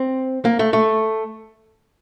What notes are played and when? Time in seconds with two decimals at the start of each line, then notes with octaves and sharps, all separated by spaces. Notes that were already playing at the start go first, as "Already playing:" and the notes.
Already playing: C4
0.45 A#3
0.59 A3
0.73 A3